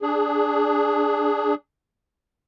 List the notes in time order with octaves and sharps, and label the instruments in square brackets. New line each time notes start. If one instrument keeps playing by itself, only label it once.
[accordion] D4 G#4